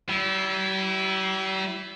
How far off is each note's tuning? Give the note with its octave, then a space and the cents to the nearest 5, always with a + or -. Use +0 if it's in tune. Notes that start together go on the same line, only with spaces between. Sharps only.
G3 -45 E4 +0